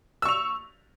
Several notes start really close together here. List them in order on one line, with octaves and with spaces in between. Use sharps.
E6 C#6 F7